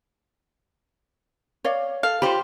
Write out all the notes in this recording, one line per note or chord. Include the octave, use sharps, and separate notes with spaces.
C#5 D5 F5
A4 F5
F4 G4 C5 B5